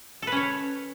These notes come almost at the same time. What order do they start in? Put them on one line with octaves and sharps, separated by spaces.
A4 B4 C#4 C#5